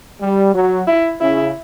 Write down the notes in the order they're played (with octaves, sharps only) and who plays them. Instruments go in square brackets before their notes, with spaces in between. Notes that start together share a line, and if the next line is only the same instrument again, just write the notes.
[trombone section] G3
F#3
[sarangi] E4
[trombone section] C#3 [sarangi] E4